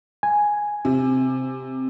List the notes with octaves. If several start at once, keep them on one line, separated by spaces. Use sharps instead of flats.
G#5
C3